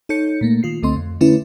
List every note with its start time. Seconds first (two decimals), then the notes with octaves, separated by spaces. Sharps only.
0.09 D#4 A4 C#5 G6 C#7
0.41 A#2 A3 A#3
0.63 D#3 F4 C7
0.83 C#2 D3 A3 C4 D#5 C6
0.96 F2
1.21 D3 A3 C#4 E4 B4